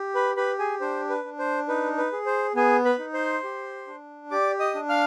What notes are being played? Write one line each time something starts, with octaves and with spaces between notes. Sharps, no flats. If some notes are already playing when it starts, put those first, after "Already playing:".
Already playing: G4
B4 B5
G4 B4 B5
G#4 G#5
D4 C5
B4
D4
C5
D#4 B4
B4
G#4
C5
B3 G#4 G#5
B4 B5
D#4
C5 C6
G4
D4
G4 D5 D6
D#5 D#6
D4
F5 F6